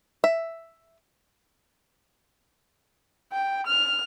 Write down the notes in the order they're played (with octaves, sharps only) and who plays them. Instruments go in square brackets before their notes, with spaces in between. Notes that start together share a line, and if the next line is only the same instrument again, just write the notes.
[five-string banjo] E5
[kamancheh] G5
F6